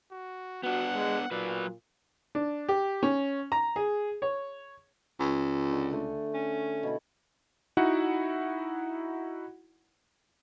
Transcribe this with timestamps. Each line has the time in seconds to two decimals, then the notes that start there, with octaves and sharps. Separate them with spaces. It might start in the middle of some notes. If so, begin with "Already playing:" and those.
0.11 F#4
0.63 B3 D4 F#4 F#5
0.95 G#3
1.31 A#2 F#3 B4 D5
2.35 D4
2.69 G4
3.03 C#4
3.52 A#5
3.76 G#4
4.22 C#5
5.20 C#2
5.71 D3
5.91 D3 A3 G#5
6.34 C#4
6.83 B2 E4
7.77 D#4 E4 F#4 F#5